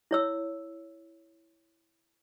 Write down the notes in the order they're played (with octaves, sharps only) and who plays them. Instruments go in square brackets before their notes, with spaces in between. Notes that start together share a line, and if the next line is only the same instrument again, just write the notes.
[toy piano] E4 C#5 E6